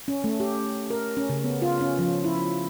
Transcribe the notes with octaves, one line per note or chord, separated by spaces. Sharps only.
C#4
A3
G4
A#4
C#4
C#3
B3
F4
C#4
F3
E4